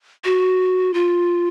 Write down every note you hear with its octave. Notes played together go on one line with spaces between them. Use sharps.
F#4
F4